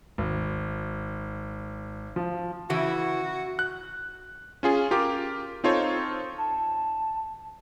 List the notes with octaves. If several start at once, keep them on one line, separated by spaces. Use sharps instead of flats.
G#1
F3
C#3 E3 E4 F#4
F#6
C#4 F4 G#4
F4 G4 A#4 D6
C4 D#4 F4 A4 C5 C#5
A5